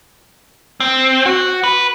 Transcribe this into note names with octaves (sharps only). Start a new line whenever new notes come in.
C4
F#4
B4